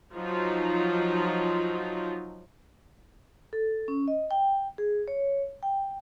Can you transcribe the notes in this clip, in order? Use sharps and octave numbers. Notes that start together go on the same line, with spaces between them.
F3 F#3 D#4 F4
A4
C#4
D#5
G5
G#4
C#5
G5